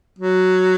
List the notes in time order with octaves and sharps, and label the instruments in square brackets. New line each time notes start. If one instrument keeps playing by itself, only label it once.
[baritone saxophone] F#3